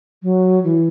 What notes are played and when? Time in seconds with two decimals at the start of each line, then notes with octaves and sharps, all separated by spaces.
0.23 F#3
0.64 E3